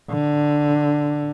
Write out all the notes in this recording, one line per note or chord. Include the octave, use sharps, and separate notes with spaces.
D3